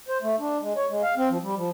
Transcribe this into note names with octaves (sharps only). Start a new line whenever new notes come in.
C5
A3
D4
G#3
C#5
G#3
F5
C4
F3
G3
F3